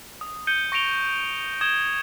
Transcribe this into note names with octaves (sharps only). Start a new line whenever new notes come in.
D#6
G6 C#7 D#7 G7
C#6 A#6 C#7 D7 F7 G7
D#6 G#6 E7 G7